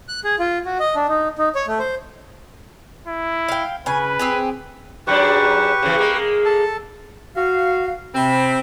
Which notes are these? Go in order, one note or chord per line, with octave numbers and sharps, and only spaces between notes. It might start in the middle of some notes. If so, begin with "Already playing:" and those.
F#6
G#4
F4
F#4
D#5
D4
D#4
D#4
C#5
A3
C5
E4
F5 G5
C#3 B4 G#5
C4 G4 G#4
G#2 F#3 D4 G4 B4 C#6
C#3 E3
G#3 A#3
A4 A5
F#4 F5
C3 C4 B5